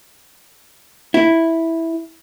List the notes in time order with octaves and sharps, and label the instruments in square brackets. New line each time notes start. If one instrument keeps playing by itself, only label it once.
[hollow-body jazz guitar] E4